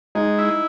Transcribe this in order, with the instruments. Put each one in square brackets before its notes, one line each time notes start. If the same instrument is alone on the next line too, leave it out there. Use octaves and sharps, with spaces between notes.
[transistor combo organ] G#3 [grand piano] D#4
[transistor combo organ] E4